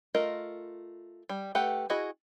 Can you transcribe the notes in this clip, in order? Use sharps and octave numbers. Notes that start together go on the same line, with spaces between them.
A3 F4 A#4 D#5
G3
A3 G4 B4 F#5 G5
E4 F#4 G#4 D#5